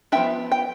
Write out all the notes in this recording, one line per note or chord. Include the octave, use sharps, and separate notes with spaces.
F3 B3 D4 E5 G5
G5